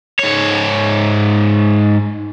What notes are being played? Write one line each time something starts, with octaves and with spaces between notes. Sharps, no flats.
G#2 C#5